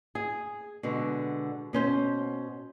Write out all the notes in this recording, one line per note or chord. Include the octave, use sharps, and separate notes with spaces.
G#4
B2 D3 G#3
B2 C#4 C5